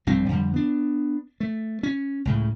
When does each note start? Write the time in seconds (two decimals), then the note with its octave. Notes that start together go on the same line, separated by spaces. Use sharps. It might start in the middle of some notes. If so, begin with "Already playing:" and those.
0.07 A#1 G2 G3 C4
0.29 F2 D3 G3
0.54 B3 D4
1.40 A3
1.83 C#4
2.25 C#2 A2 C#3